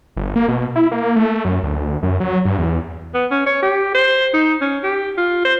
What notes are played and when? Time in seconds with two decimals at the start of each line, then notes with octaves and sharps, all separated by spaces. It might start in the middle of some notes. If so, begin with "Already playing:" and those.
0.17 G1
0.36 A#3
0.48 B2
0.76 E4
0.92 A#3
1.16 A3
1.45 F#2
1.64 D2
2.03 F#2
2.20 F#3
2.45 G2
2.58 E2
3.14 B3
3.31 C#4
3.46 C#5
3.63 G4
3.94 C5
4.34 D#4
4.61 C#4
4.83 G4
5.17 F4
5.45 C5